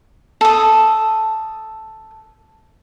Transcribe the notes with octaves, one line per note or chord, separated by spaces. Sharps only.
A4 D#6